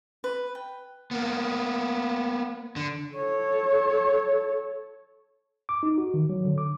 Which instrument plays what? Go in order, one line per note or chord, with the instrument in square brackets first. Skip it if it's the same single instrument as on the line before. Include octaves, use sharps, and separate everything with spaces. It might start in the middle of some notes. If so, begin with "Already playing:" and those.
[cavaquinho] B4
G5
[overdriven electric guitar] A#3 B3
D3
[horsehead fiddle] A4 C#5
[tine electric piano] D6
D#4
F#4
D#3
F#3
D3
D6